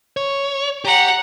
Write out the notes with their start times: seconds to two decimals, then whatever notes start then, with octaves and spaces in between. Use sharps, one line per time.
0.17 C#5
0.85 G4 F#5 A#5